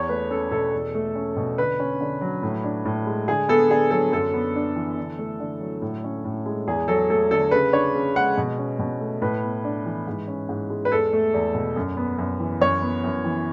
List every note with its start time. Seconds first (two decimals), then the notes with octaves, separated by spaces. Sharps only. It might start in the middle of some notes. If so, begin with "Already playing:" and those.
Already playing: E2 C#5
0.09 A3 B4
0.30 C#4 A4
0.51 B2 A4
0.73 E2
0.95 A3
1.15 C#4
1.36 B2
1.58 D3 B4
1.80 C#4
2.01 D3
2.21 F#3
2.43 A2
2.64 D4
2.85 A2
3.06 G#3
3.28 D3 G#4
3.49 B3 A4
3.70 D3 G#4
3.91 F#3 A4
4.12 F#2 A4
4.34 B3
4.55 D4
4.76 E3
4.98 D3
5.19 A3
5.40 D3
5.60 F#3
5.82 A2
6.04 C#4
6.24 A2
6.46 G#3
6.67 E2 G#4
6.88 F#3 A4
7.10 A3 A4
7.31 D3 A4
7.51 C#3 B4
7.73 D4 C#5
7.94 C#3
8.15 G#3 F#5
8.37 B2
8.58 C#4
8.79 B2
9.00 A3
9.22 A2 B4
9.43 B3
9.64 D4
9.85 E3
10.07 G#2
10.28 C#4
10.49 G#2
10.70 G#3
10.85 B4
10.92 E2 A4
11.13 A3
11.34 E2
11.55 B2
11.76 F#2
11.97 B3
12.18 F#2
12.40 E3
12.61 F#2 C#5
12.82 B3
13.04 F#2
13.25 E3